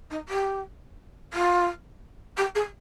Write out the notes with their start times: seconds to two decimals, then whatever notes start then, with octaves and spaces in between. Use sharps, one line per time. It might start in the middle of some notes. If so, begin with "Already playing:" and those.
0.10 D#4
0.28 G4
1.33 F4
2.37 G4
2.55 G#4